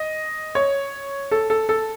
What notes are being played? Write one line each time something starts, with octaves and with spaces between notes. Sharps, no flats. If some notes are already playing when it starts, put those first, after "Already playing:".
Already playing: D#5
C#5
A4
A4
A4